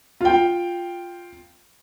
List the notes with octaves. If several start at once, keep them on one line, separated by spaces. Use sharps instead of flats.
F4 G5